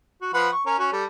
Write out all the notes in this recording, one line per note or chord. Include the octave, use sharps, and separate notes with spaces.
F#4
F3 B4 F#5
C#6
C#4 A#4
C#4 F#4
G3 A4